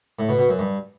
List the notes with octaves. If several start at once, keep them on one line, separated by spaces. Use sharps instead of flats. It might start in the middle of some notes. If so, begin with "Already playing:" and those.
A2
B2
B2
F#2
G2